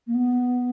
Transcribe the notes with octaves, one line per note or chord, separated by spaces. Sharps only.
A#3
B3